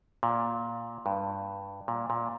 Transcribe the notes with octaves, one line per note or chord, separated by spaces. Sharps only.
A#2
G2
A#2
A#2